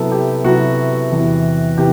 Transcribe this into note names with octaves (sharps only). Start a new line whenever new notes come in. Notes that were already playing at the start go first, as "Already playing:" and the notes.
Already playing: C3 F#3 B3 E4 A4
G4
C3 F#3 B3 E4 F#4
E2 C3 E3
C3 E3 G4